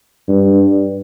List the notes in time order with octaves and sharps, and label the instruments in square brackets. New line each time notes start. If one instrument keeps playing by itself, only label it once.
[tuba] G2